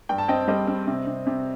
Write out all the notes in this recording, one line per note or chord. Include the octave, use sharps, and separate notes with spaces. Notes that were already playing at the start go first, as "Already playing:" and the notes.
G2 G5
A5
C4 D#5 G5
G3 C5 D#5
C4
C3
C3
C3